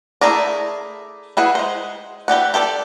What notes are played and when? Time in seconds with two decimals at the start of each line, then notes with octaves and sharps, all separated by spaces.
0.21 A3 E4 G#4 A#4 D5
1.37 E4 G#4 B4 F#5
1.55 G#3 C5
2.28 E3 G4 D5 F#5
2.54 G4 A4 C5 D5